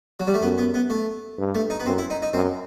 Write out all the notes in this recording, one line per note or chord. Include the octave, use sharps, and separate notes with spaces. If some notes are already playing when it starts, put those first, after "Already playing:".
F#3
G3
A3
F#2 B3
B3
B3
A3
G2
A3
D#4
B3
F#2 C4
E4
D#4
D#4
F#2 C4